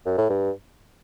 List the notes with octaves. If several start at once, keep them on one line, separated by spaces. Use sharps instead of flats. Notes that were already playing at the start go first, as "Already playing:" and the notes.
F#2
A2
G2